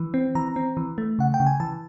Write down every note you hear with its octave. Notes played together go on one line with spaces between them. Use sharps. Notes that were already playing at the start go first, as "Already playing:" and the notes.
Already playing: E3
C4
E3 A#5
C4
E3
A3
C#3 F#5
G5
C#3
G#5
E3 A5